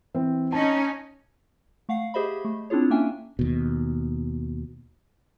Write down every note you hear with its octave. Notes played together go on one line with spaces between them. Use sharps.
E3 C4
C#4 D#4 A5
A3 F5 F#5 C7
G4 G#4 C5 D#5 E5 B5
A3
C4 D4 E4 F4 G#4 C#5
A#3 C#4 D4 E5 G5 G#5
D#2 B2